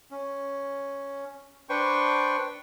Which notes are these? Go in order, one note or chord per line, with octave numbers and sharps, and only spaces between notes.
C#4
D4 B4 C5 G5 C#6